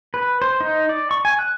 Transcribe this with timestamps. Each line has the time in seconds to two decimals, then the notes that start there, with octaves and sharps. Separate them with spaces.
0.14 B4
0.42 C5
0.61 D#4
0.89 D5
1.11 C#6
1.25 G#5
1.39 F#6